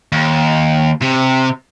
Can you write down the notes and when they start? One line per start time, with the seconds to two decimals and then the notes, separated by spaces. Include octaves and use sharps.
0.12 D#2
1.02 C3